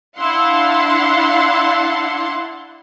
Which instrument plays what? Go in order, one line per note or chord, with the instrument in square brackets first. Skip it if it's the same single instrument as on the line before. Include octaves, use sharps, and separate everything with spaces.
[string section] D4 E4 F5 F#5 C6